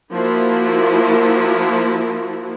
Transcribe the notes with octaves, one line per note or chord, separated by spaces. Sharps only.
F3 A#3 E4 F#4